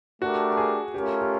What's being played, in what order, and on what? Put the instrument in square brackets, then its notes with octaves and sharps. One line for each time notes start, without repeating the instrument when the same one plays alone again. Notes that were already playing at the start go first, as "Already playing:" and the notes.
[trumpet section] A3 D4 G4 A#4 [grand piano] F#4
[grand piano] G#4
[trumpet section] A3 C#4 F4 A#4 [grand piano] G4
[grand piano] G4